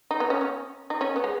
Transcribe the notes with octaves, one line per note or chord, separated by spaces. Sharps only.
D#4
B3
C#4
C#4
D#4
C#4
B3
G#3